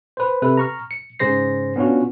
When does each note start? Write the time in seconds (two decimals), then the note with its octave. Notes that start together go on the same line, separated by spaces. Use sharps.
0.17 B4 C5
0.42 C3 A4 B4
0.57 A#5 C#6 F6
0.91 C#7
1.19 G#2 C#3 G#4 C5 A#6 C7
1.76 B3 C#4 D4 F4 F#4